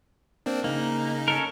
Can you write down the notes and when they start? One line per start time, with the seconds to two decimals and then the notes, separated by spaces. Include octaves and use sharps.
0.46 A#3 C4 D4
0.64 C#3 A#3 D#4
1.28 C#4 A4 A#4